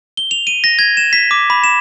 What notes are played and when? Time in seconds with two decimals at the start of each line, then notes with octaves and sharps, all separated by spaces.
0.17 G7
0.31 F7
0.47 D#7
0.64 A#6
0.79 G#6
0.97 E7
1.13 B6
1.31 D6
1.50 B5
1.64 E7